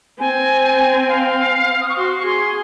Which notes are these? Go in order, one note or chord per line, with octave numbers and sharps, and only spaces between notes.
C4 G#5
F5
F6
D#6
C#6
F#4 C6
C#6
G#4 C6